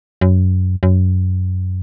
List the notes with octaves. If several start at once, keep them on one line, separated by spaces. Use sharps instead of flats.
F#2
F#2